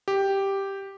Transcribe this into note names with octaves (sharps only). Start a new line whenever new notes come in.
G4